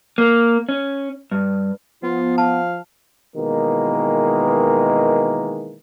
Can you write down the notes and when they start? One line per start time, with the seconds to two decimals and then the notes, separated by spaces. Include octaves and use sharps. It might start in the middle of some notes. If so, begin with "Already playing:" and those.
0.18 A#3
0.69 C#4
1.31 G2
2.03 F3 B3 F4
2.38 F5 A5
3.37 B2 D#3 E3 G#3 A#3